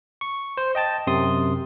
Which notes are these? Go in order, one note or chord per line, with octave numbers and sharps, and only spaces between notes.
C#6
C5
D#5 G5 A5 A6
F#2 C3 C6 D#6